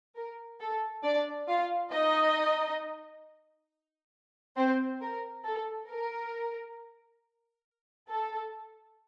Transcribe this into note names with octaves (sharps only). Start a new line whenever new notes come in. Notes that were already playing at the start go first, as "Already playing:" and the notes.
A#4
A4
D4 D5
F4 F5
D#4 D#5
C4 C5
A#4
A4
A#4
A4